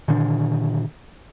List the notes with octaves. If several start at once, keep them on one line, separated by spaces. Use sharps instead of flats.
A#2 D3 D#3 D4